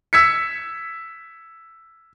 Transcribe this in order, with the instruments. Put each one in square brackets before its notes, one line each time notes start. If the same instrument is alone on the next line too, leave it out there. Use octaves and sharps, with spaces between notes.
[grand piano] E6 G#6 B6 C#7